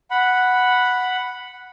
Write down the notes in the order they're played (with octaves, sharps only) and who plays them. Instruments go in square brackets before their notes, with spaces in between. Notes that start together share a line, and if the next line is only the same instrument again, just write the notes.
[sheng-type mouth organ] F#5 B5